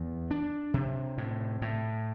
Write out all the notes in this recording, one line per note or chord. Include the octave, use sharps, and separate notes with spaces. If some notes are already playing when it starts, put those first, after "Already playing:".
Already playing: E2
D4
C3
A2
A2